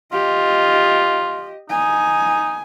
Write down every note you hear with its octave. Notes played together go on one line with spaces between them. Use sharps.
F4 G4 D#5
D#4 G#5